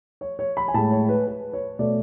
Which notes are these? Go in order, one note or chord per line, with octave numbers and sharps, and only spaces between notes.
C#5
C#5
B5
G#5
A2 G#3 A5
C#5
B4
B4
C#5
B2 A3 D5